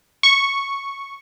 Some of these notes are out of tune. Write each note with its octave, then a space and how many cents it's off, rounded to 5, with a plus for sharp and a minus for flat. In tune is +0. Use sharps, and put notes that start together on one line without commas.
C#6 -5